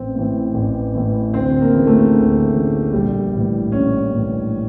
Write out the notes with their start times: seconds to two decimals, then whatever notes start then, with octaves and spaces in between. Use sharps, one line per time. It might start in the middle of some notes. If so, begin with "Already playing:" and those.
Already playing: A1 C4
0.15 A2 E3
0.54 A1
0.95 A2 E3
1.33 D2 C4
1.61 A#3
1.74 C#3 E3
1.87 A3
2.13 D2
2.54 C#3 E3
2.93 A#1 G3
3.33 A2 E3
3.72 A#1 C#4
4.12 A2 E3